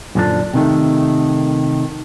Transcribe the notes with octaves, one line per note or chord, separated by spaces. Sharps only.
F#2 A#2 D3 F3 D4
C3 D#3 A3